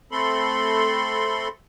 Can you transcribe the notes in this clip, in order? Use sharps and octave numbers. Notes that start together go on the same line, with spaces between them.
A3 C4 A4 B5 C6